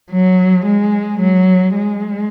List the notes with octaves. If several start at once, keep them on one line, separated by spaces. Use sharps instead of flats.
F#3
G#3
F#3
G#3